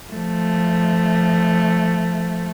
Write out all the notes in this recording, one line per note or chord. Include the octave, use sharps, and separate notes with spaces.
F3 A3